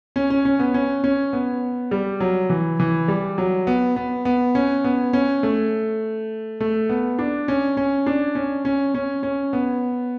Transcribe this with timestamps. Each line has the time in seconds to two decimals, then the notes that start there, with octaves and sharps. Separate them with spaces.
0.16 C#4
0.30 C#4
0.45 C#4
0.59 B3
0.74 C#4
1.04 C#4
1.33 B3
1.91 G3
2.20 F#3
2.50 E3
2.80 E3
3.08 G3
3.38 F#3
3.67 B3
3.96 B3
4.25 B3
4.55 C#4
4.84 B3
5.13 C#4
5.43 A3
6.60 A3
6.89 B3
7.19 D4
7.48 C#4
7.77 C#4
8.06 D4
8.35 C#4
8.65 C#4
8.94 C#4
9.23 C#4
9.53 B3